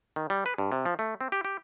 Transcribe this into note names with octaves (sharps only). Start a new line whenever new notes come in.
D#3
G3
B4
G2
C3
F3
A3
C4
G4
G4